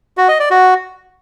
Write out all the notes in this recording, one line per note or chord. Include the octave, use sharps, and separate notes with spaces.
F#4
D#5
D5
F#4